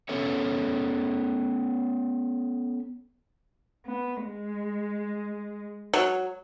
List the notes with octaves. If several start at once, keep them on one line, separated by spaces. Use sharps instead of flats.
B3 C#4 A4 C#5 E5
B3
G#3
F#3